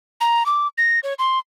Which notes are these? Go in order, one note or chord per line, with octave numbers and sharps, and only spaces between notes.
A#5
D6
A#6
C#5
C6